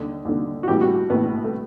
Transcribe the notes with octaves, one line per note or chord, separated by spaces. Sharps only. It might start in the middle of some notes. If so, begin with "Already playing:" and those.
Already playing: D#2 D3
D#2 D3
F#4
A#1 A2 E3 G4
F#4
A#1 A2 E3 B3
A3